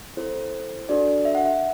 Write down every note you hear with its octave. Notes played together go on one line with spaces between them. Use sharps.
C4 E4 A4 C5
D4 F#4 A4 D5
E5
F#5
E5